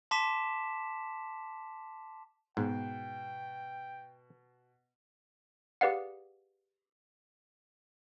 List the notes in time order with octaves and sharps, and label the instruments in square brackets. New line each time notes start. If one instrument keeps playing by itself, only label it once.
[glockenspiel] A5 C6 D6 B6 E7
[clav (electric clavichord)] G#2 [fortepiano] B2 [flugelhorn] G5
[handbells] G4 G#4 B4 D5 F5 F#5